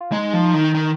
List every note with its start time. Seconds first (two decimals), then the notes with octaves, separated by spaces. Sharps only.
0.01 F4
0.12 G#3 D#4
0.33 F3
0.54 D#3
0.74 D#3